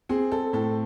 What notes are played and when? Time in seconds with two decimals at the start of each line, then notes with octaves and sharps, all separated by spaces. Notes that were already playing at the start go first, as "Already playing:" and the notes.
0.09 C4 G#4
0.32 A4
0.53 A2 A4